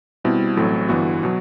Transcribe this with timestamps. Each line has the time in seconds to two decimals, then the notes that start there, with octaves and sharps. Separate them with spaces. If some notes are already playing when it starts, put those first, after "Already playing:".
0.24 B2 G3 C4 E4
0.57 A1 A2 F#3 A3 C4
0.88 G1 G2 E3 B3 F#4
1.23 B2 F#3